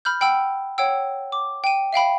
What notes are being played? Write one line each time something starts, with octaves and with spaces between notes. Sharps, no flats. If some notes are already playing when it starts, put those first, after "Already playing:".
B5 F6 G6
F#5 G5 B5 E6
C#5 F#5 G5 E6
D6
G5 D#7
E5 F5 G5 B5